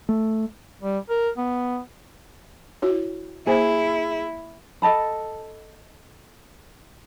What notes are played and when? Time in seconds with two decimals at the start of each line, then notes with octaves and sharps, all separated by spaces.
0.09 A3
0.82 G3
1.09 A#4
1.37 B3
2.82 E4 F#4 C#5
3.47 A#3 E4 G#4 C5
4.82 A4 D#5 A5 B5